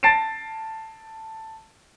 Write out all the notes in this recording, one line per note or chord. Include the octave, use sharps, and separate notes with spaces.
A5 A6 C7 D7 E7